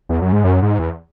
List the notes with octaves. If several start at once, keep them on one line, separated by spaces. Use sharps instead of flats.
E2
F#2
G#2
F#2
G#2
E2